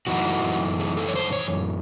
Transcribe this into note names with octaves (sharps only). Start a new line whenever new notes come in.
F#2 E3 A3 D#4 F#4
G#4
A4
C#5
C5
C#5